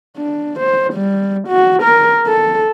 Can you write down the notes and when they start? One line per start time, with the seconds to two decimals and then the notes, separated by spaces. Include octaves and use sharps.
0.17 D4
0.60 C5
0.94 G3
1.48 F#4
1.83 A#4
2.27 A4